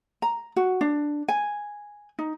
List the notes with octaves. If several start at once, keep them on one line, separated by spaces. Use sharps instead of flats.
A#5
F#4
D4
G#5
D#4